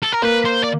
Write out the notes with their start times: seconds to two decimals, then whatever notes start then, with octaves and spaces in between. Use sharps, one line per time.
0.03 A4
0.12 A#4
0.22 A#3 B4
0.45 C5
0.64 D5